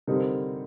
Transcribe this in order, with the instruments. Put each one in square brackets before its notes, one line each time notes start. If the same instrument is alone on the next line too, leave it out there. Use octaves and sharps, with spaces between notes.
[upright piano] D3 G3 C4 D#4 A#4